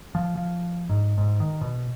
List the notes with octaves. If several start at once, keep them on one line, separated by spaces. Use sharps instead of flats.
F3
F3
G#2
G#2
D#3
B2